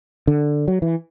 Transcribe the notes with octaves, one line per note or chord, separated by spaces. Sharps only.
D3
F#3
E3